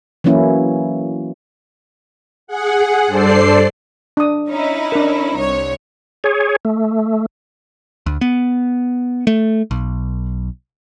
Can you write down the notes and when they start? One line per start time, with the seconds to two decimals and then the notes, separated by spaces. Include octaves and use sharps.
0.24 E3 F#3 A#3 C#4 E4
2.47 G#4 F#5
3.07 G2 A4 C5 D5 C7
4.17 D4 D#6
4.48 C#4 D#4 E4
4.92 D4 A#4
5.37 C2 C#5
6.24 G#4 C#5
6.65 A3
8.06 D2
8.21 B3
9.27 A3
9.71 B1